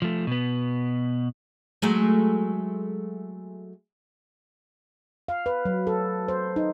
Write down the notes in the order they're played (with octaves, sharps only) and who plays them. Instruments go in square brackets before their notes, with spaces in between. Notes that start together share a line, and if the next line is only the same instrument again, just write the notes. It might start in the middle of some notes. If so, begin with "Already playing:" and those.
[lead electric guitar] F3 A3
B2 B3
[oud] F#3 G#3 A3
[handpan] F5
B4
F#3
A4
C5
D#4